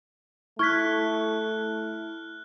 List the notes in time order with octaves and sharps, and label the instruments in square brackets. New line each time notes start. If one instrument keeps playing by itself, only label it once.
[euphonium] A3 [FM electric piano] E4 [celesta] C#6 G#6 B6 [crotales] F6 F#6